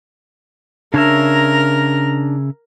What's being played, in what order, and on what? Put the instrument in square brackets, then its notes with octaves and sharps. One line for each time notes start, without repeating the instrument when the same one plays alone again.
[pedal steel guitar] C#3 C#5 E5 [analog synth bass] D4 [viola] A#4 A#5